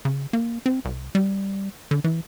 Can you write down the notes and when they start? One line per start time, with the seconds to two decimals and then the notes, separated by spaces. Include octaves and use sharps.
0.05 C#3
0.33 A#3
0.66 C4
0.85 C2
1.15 G3
1.91 D3
2.04 E3